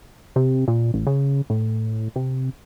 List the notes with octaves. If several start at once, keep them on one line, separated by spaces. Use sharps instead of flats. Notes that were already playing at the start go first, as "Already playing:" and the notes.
C3
A#2
A1
C#3
A2
C3